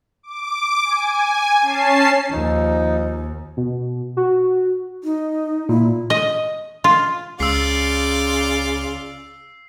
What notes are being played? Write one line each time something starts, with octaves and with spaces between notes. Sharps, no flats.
D6
G#5
C#4 A5 C7
D#2 F3 D#4
B2
F#4
D#4
A#2 E4
D#5
F4
C#2 C#3 F4 D5 E6 C7